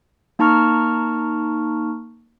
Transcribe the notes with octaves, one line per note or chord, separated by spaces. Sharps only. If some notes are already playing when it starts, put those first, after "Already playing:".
A#3 D#4 A5 A#5 C#6 F6